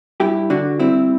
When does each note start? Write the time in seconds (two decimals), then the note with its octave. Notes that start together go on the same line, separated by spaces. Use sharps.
0.20 G2 E4 G4
0.50 D3 D4 F#4
0.79 G3 C4 E4